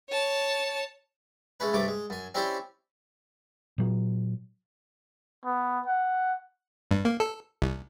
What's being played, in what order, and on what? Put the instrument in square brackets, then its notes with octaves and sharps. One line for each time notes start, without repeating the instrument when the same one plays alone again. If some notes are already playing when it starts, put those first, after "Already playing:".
[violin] C#5 A5
[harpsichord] G#3 A3 C#4 B4
G2 C3 A3 D6
G#3
F#2 G#5
C4 C#4 E4 G4 C5 D5
[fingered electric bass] A#2 F#3
[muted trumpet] B3
F#5
[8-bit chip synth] G2
A#3
A4
C2